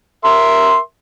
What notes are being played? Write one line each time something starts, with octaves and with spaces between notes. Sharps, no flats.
A#4 E5 C6